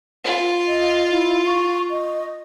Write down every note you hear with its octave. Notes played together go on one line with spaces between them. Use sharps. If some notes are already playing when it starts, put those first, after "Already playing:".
F4
D#5
E4
C#6
D#5